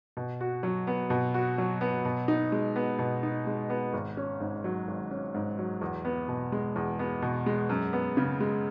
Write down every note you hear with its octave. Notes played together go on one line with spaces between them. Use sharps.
B2
F#4
F#3
B3
B2
F#4
F#3
B3
B2
D#4
G#3
B3
B2
D#4
G#3
B3
G#1
C#4
G#2
F#3
G#1
C#4
G#2
F#3
E2
B3
B2
G#3
E2
B3
B2
G#3
F#2
B3
C#3
G#3